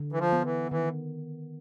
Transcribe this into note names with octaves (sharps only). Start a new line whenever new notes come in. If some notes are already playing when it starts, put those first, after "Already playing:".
Already playing: D3
E3
F3
B3
E3
D#3 E3